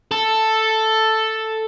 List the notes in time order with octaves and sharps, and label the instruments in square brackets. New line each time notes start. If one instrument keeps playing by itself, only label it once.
[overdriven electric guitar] A4